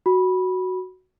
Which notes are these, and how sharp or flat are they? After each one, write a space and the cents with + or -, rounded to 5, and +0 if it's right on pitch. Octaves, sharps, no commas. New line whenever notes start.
F#4 +0 B5 -10